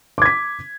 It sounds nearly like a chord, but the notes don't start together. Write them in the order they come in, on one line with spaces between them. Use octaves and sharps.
D6 G#6 B6